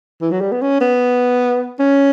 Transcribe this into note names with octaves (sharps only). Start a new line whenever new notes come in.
E3
F#3
G3
B3
C#4
B3
C#4